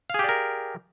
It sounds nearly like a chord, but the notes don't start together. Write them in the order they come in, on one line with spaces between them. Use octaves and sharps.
F5 G#4 G4 D5 A#4